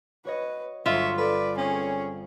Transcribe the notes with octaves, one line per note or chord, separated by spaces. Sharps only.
F#4 B4 C#5 D#5
G1 F#3 F4 C#5 E5 C6
A4 B4 D5
C4 C#4 G#4 C#5